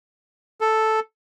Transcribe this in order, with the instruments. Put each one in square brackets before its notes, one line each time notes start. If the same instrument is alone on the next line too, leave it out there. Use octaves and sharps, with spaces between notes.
[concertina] A4